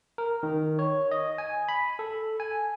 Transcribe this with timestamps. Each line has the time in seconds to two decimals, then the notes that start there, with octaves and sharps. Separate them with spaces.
0.18 A#4
0.43 D#3
0.79 C#5
1.11 D#5
1.38 G#5
1.68 B5
1.99 A4
2.40 G#5